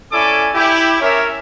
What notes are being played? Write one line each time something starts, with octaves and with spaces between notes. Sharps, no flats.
C#4 E4 A4 D5 G#5 D6
E4 G4
C#4 A#4 C#5 E5